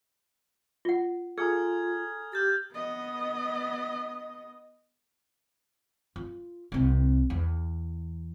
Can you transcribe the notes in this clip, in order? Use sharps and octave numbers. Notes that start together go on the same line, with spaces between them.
F4 F#5
F4 G#4 A4 G#5 A#5 D#6 F6 G#6
G4 F6 G6 A6
B3 D#5
F4
C2 C3
E2